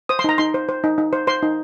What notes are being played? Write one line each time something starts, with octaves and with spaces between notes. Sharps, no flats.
C5 D#6
C6
D#4 A#5
D#4 C6
C5
C5
D#4
D#4
C5
C5 C6
D#4